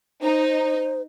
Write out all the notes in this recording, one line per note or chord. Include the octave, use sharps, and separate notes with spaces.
D#4 C5